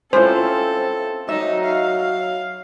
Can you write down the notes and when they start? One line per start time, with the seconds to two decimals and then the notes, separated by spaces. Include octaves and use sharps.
0.13 C4 C#4 E4 F4 A4 C5
1.29 F#3 D#4 E5
1.64 F5